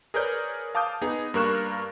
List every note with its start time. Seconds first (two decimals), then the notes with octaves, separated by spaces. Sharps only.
0.14 G#4 A#4 B4 C#5 D5 G6
0.75 F5 A5 D6 D#6 G6
1.02 B3 D#4 G#4
1.34 G2 A#3 A#4 C#6 F#6 E7